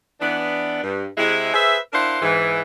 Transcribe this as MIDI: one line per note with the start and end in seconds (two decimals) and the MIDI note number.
0.21 0.80 52
0.21 0.80 59
0.21 0.80 62
0.82 1.06 43
1.17 1.52 48
1.17 1.52 56
1.17 1.52 64
1.54 1.78 68
1.54 1.78 71
1.54 1.78 72
1.54 1.78 76
1.93 2.19 62
1.93 2.19 64
1.93 2.19 70
1.93 2.19 72
1.93 2.19 77
1.93 2.19 78
2.22 2.61 44
2.22 2.61 52